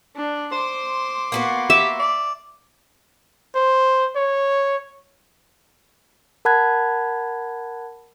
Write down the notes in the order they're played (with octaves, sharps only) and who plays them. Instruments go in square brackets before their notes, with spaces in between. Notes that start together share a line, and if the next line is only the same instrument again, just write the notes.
[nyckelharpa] D4
[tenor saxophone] C5 [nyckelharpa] C6 D6
[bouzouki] A#3 B3 F#4
[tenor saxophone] G4 [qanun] E5
[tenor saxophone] D5
[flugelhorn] C5
C#5
[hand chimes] A#4 F#5 A5 B5 F#6 G#6